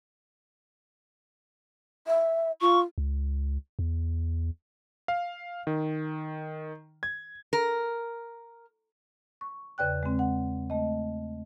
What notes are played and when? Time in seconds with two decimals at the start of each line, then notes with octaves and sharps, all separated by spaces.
2.07 E5
2.61 F4 C#6
2.98 C#2
3.79 E2
5.08 F5
5.67 D#3
7.03 G#6
7.53 A#4
9.41 C#6
9.78 E2 C#3 B4 D5 G5 F#6
10.03 G#3 C4
10.19 F#5
10.70 A3 D#5